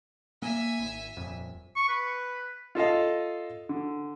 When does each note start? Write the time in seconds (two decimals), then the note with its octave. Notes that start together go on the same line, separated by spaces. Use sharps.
0.42 A#3 E5 G#5
0.79 G#1
1.17 D#1 F2
1.76 C#6
1.89 B4
2.75 F4 A4 D#5 F5
3.69 D3